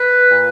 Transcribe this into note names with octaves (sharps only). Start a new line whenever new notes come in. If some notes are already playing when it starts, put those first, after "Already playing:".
Already playing: B4
A#2